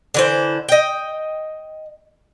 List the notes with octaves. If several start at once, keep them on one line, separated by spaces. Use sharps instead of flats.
D3 E3 C5
D#5 G5